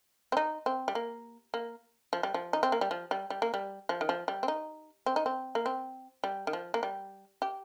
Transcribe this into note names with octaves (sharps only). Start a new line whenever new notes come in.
C4
D#4
C4
G3
A#3
A#3
F3
G3
F3
D#4
C4
A#3
G3
F3
G3
G3
A#3
G3
F3
D#3
F3
G3
C4
D#4
C4
D#4
C4
A#3
C4
G3
D#3
F3
A#3
G3
G4